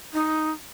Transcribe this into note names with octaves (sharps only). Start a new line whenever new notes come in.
D#4